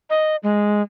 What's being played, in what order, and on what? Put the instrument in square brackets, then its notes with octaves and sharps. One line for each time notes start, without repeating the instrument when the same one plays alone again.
[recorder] D#5
G#3